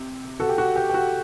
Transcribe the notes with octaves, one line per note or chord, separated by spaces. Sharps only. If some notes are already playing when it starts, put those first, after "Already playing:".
Already playing: C3
F#4 A4
G4
F#4
G4
G4
F#4 A4